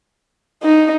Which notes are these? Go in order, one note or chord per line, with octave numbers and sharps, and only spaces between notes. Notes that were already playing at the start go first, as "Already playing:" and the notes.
D#4